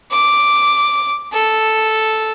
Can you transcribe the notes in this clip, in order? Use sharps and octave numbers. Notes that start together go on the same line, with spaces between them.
D6
A4